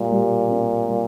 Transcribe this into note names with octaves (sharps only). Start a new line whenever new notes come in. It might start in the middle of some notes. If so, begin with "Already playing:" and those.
Already playing: A#2 G3
G3
C4
G3